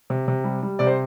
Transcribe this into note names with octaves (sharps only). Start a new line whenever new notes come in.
C3
C3
G3
G3
C3 D5
C5